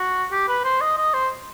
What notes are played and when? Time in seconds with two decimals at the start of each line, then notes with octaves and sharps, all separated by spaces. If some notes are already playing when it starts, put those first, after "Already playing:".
Already playing: F#4
0.32 G4
0.49 B4
0.65 C5
0.81 D#5
0.98 D#5
1.14 C5